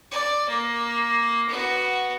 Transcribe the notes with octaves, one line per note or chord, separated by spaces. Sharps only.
D5
A#3
B3 F#4